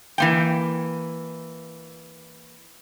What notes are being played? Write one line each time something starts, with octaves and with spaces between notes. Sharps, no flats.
E3 A#3 G5